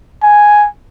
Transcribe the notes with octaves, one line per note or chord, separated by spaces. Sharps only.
G#5